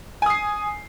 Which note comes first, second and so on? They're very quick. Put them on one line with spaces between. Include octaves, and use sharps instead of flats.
G#5 D#6 C7